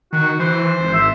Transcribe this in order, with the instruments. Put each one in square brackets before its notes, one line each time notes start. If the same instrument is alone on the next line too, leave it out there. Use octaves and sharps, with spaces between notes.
[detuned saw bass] D#3 [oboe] F#4
[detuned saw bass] E3 [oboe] C5
[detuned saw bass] G#1
[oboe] E5